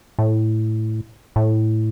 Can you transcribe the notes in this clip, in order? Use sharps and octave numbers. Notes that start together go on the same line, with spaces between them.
A2
A2